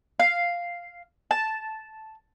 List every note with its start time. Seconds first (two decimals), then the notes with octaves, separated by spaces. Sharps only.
0.19 F5
1.31 A5